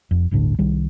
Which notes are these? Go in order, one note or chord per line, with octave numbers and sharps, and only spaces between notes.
F1 F2
G1 D2 A2 D3
C2 D#3 G3